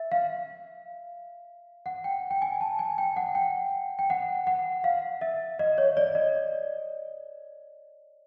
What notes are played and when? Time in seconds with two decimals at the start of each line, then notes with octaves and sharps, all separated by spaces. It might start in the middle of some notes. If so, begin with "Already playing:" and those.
Already playing: E5
0.12 F5
1.86 F#5
2.04 G5
2.31 G5
2.42 G#5
2.61 A5
2.79 G#5
2.98 G5
3.17 F#5
3.35 G5
3.99 G5
4.10 F#5
4.47 F#5
4.84 F5
5.21 E5
5.59 D#5
5.78 C#5
5.97 D5
6.15 D#5